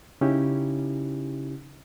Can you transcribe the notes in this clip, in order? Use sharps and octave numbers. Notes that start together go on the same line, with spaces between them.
C#3 C#4 D#4 E4 G4